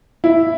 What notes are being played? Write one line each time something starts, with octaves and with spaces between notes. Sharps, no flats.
E4